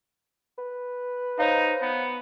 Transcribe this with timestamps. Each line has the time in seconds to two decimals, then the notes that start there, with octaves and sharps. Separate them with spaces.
0.58 B4
1.39 D#4 C5 C#5 F5
1.82 B3